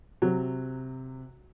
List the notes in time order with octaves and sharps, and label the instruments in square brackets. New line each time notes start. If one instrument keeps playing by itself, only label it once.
[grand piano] C3 [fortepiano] F#3